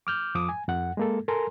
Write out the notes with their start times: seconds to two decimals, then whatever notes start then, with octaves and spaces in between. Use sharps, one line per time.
0.07 D6 F6 G6
0.35 F2 F3 D6 D#6
0.49 G#5
0.68 F2 F#5
0.97 G#3 A#3 A4
1.28 A4 A#4 G#5 A#5 C6